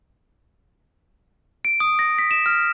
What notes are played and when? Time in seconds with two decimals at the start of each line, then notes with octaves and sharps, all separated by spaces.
1.65 D7
1.80 D#6
1.99 A#6
2.19 B6
2.31 E7
2.46 F6